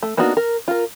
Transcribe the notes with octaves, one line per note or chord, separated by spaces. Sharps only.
A3
A#3 B3 D4 D#4 F#4
A#4
F4 A#4